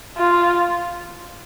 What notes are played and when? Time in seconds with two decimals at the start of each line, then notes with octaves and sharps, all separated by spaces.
0.18 F4